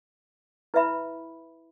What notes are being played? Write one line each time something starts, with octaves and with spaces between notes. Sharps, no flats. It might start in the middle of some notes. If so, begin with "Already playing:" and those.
E4 B4 E5 B5